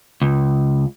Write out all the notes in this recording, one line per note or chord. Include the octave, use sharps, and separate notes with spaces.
C#2